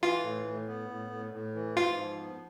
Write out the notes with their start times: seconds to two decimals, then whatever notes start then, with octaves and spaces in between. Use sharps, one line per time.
0.02 E3 F4
0.23 A2
0.46 A2
0.68 B3
0.89 A2
1.10 A2
1.33 A2
1.54 E3
1.77 G#2 F4
1.98 F3
2.19 B3